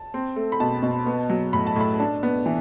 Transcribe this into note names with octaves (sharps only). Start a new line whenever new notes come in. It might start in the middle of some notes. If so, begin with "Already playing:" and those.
Already playing: A5
C4
A3
B5
B2 A5
B2
B3
F#3
A2 B5
A5
A2 B5
D4 A5
B3
E3